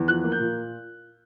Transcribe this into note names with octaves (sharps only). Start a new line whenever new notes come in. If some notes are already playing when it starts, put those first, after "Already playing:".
Already playing: E2
F3 F#6
A#3
G6
A#2